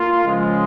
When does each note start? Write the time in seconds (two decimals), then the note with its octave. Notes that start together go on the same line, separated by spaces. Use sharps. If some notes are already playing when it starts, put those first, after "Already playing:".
Already playing: A#3 F4
0.25 C#3 F3 G#3